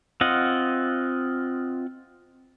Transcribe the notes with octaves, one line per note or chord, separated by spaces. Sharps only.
C4 F4 D#5 F#5